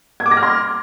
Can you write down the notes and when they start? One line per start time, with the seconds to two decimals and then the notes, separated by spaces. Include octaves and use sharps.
0.20 G#6
0.26 D6
0.31 A#6
0.37 F6
0.43 C6